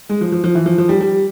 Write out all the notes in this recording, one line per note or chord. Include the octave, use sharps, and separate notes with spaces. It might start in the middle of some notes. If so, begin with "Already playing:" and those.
G#3
F3
F3
F3
E3
F3
F3
G3
G3